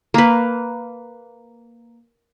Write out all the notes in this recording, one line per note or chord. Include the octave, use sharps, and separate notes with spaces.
A#3 B4